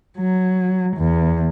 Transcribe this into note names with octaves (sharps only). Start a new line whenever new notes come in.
F#3
E2